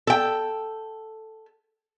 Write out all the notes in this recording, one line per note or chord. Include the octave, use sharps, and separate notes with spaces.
A4 G5